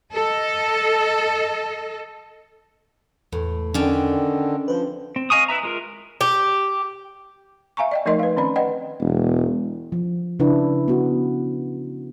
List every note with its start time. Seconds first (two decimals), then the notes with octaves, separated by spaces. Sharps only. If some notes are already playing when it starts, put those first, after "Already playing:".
0.12 A4 D#5
3.32 E2 A2
3.74 D3 D#3 C#4 D4 G5
4.68 F3 B4 C5
5.16 C4
5.30 D#5 F5 G#5 C#6 D#6
5.48 E4 B4 E5 A#5
5.63 G#3 F4 A#4
6.21 G4
7.77 E5 F5 G#5 A#5 C#6
7.91 D5 D#5 G5
8.06 F3 A3 D#4 A#4 D#5 C6
8.19 B4 F5
8.37 D#3 C4 C#4 D5 B5
8.56 B4 D5 D#5 F#5 G5
9.00 E1
9.92 F3
10.40 C#3 D4 E4 B4
10.88 B3 F#4